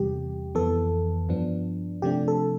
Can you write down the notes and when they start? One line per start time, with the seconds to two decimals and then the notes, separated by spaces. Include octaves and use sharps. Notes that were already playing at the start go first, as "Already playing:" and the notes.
Already playing: E2 C3 G3 G4
0.55 F2 E3 B3 A4
1.29 G2 F3 B3 D4
2.02 C3 F3 A3 D4 G4
2.28 A4